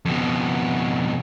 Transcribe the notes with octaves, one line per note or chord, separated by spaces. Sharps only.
F2 B2